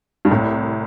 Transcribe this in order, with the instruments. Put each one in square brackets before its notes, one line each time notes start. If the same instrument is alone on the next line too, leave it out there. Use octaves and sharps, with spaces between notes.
[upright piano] G2
[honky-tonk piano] C2 [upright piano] A2